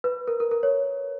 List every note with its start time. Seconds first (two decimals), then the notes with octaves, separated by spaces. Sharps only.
0.04 B4
0.28 A#4
0.40 A#4
0.51 A#4
0.63 C#5